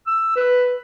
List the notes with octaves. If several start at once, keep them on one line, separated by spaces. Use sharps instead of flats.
E6
B4